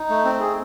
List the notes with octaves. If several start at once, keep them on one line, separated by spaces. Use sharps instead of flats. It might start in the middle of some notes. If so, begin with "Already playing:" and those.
Already playing: D#4
A3
C4
G#4